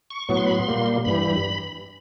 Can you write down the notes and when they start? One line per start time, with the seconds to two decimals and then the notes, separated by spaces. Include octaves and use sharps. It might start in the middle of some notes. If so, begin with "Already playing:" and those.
0.11 C#6
0.29 A2 F#3 B3 C#6
0.37 C6
0.47 B5
0.55 C6
0.68 A#2 G3 A#3
1.05 G2 E3 G3 B5